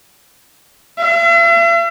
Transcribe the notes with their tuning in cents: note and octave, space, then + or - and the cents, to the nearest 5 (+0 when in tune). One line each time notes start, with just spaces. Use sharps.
E5 +45